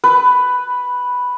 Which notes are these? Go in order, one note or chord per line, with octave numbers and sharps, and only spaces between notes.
B4